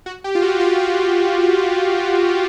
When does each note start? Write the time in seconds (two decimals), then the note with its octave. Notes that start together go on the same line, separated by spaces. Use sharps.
0.06 F#4
0.24 G4
0.35 F4
0.42 F#4
0.60 F4
0.79 F#4